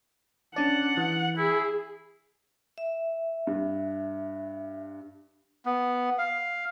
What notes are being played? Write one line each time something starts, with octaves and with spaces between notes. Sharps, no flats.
C#4 D4 D5 F#5 A5
E3
E4 G#4
E5
G2
B3
F5